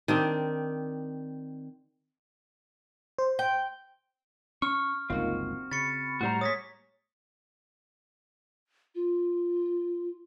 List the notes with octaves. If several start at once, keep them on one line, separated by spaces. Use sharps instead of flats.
D#3 C4 D4
C5
G5
C#4 C#6 F6
G1 C#2 A#3 C4 D#4 F4 F#4
C#3 B5 C#6 A6 C#7
A2 G3 F#4 C5 A#5
G#3 A#3 C#5 D#6 G#6 A#6 B6
F4